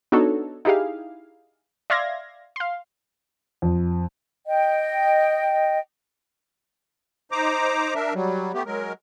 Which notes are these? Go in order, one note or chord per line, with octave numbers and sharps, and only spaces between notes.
B3 D4 D#4 F#4 A4 C#5
D#4 E4 G4 G#4 F5
D5 E5 F5 C6 G#6 A#6
F5 C6
F2
D#5 G5
D#4 C5 A#5 D6
D4 A#4 E5
F#3 G3
A3 B3 G4
F#3 G#3 A#4